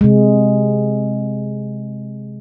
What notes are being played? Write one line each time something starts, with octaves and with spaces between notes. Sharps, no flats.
C3 G#3